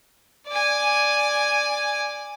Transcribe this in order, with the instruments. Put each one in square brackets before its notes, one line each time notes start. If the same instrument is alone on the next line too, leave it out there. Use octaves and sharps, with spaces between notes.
[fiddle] D5 G#5